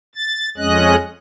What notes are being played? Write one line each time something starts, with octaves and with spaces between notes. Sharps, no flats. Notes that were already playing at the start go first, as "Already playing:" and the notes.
A6
F2 G#3 C#4 D#5 F#6